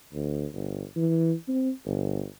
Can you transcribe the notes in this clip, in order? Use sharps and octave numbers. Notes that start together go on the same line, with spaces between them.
D2
G1
E3
C4
G1